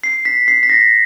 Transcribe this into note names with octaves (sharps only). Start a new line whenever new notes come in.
C7
B6
C7
B6
A#6